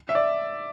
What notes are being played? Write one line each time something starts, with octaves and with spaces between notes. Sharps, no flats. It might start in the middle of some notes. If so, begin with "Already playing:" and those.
E5
D5